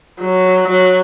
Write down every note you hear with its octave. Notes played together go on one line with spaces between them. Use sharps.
F#3
F#3